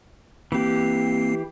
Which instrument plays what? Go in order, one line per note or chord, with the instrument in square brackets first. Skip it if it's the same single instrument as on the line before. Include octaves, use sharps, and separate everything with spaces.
[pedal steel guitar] E3 G4 [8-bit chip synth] A#3 C4 C7